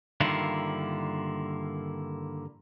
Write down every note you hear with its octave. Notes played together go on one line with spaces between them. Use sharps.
G2 D3 D#3 A#3 E4 F4